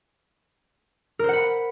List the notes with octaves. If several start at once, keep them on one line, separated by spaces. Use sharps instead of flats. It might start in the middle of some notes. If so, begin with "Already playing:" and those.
A#4 C5 F#5 B5